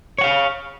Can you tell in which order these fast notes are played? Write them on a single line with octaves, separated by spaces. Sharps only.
C#5 F#5 F5